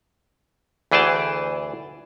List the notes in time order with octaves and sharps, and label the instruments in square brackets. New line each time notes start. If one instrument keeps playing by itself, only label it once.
[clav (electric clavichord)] D2 E3 G#4 G5 A5